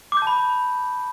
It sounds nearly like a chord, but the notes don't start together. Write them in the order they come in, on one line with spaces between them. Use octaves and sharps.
D6 G6 A5 B5